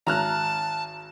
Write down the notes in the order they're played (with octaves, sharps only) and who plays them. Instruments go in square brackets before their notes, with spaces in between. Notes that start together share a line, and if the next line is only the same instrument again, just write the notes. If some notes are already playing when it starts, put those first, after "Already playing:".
[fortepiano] G#1 [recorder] A5 [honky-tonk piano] A#5 F6 F#6